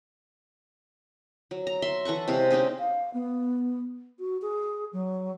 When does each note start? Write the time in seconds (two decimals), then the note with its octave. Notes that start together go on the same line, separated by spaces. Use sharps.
1.51 F#3
1.67 A#5
1.82 E5 C6
2.05 E3 A4 F#5 C#6
2.28 C3 G#3 E4 F5
2.50 C4 C#4 D#4 G#4
2.79 F5
3.14 B3
4.19 F#4
4.42 G#4
4.93 F#3